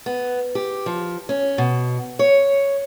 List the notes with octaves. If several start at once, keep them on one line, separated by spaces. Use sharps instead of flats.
B3
G4
F3
C#4
B2
C#5